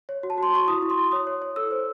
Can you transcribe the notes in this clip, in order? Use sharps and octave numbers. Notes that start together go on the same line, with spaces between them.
C#5
F#4
A5
F#4 C6
F#4 C#6
E4 D#6
E4
C6
E4
C#5 D#6
C#5
C#5
A4 E6
C5